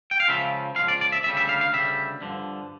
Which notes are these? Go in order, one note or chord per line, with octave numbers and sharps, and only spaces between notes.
G5
F5
C#2 C#3 F3 E5
C#2 C#3 F3 F5
D5
D5
E5
D2 C#3 G3 E5
E5
F5
F5
D2 C#3 G3 E5
G2 D3 F3